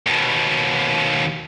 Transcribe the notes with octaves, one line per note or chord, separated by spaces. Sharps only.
D#2 B2